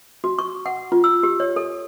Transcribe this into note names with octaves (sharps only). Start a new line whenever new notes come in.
F#4
C#6
F#5
F4
E6
G4
C#5
A4